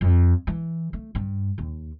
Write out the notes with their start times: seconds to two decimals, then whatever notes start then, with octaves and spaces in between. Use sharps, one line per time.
0.01 F2
0.47 E3
0.93 A3
1.15 G2
1.58 D#2